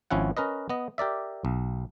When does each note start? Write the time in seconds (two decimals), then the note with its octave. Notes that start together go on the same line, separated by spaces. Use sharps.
0.11 G#1 F3 C#4 E4 F#5
0.37 C#4 A#4 B4 D#5
0.70 B3 D#5
0.98 G4 A#4 D5 E5
1.45 B1